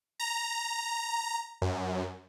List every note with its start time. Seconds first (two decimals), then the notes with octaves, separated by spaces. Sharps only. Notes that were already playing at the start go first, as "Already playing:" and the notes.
0.20 A#5
1.62 F#2